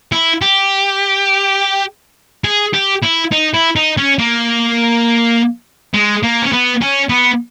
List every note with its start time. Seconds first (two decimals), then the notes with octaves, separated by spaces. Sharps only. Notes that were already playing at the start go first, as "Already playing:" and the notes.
0.12 E4
0.41 G4
2.44 G#4
2.73 G4
3.02 E4
3.32 D#4
3.54 E4
3.76 D#4
3.97 C#4
4.19 A#3
5.94 G#3
6.23 A#3
6.42 C#4
6.52 B3
6.81 C#4
7.09 B3